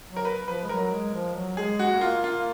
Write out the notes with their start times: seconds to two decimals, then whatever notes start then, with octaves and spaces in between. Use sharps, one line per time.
0.09 F#3
0.16 A#4
0.25 B4
0.47 F3 B4
0.63 G#3
0.69 F#3 A#4
0.91 G#3
1.14 F3
1.35 F#3
1.57 G#3 G#4
1.79 F#4
1.91 A#3
2.01 F4
2.24 F4